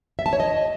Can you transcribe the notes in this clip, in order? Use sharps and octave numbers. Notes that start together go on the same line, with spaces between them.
E5
A5
C#5
D#5